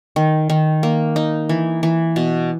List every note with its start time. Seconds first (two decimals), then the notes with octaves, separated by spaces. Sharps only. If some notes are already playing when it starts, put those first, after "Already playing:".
0.16 D#3
0.50 D#3
0.83 A#3
1.16 D#4
1.49 E3
1.83 E3
2.16 B2